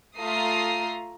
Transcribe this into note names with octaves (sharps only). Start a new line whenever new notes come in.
A3 F4 A#5 D#6 C7